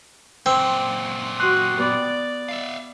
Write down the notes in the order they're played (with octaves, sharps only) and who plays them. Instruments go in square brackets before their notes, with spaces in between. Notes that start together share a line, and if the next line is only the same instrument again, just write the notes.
[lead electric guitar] F#2 A#2 [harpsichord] C4
[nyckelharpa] F#4 [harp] C6 D#6 F#6
[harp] B3 [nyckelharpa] D5
[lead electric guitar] E5 F5